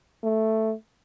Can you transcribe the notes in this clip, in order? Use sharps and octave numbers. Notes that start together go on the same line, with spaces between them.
A3